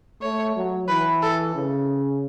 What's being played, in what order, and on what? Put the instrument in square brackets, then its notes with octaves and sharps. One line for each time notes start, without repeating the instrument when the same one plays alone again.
[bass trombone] A3 [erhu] C#5
[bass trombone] F#3
[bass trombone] E3 [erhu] B4
[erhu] A4
[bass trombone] C#3